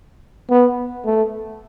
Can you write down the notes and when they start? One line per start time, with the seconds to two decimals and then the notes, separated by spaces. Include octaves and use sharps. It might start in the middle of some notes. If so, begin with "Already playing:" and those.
0.50 B3
1.06 A3